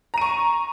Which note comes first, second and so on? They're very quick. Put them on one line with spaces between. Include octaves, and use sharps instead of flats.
A#5 D#7 C#6